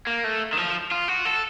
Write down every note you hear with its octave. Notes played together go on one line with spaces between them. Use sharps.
A#3
A3
D#3
F3
F4
F#4
A4